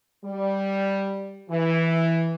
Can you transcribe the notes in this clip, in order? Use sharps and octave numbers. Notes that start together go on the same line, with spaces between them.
G3
E3